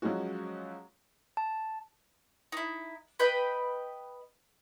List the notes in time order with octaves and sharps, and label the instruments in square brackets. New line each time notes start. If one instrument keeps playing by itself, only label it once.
[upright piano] F3 F#3 G#3 C#4 F#4
[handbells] A5
[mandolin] D#4 E4
B4 D#5 G5 B5